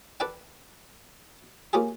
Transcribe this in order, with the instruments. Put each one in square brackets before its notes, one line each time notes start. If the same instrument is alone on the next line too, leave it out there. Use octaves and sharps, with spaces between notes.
[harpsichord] A4 B4 D5 E5 G5
A#3 C#4 F4 G4 G#4